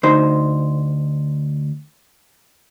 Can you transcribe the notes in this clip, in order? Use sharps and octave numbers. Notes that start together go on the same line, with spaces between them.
D2 D#4 C5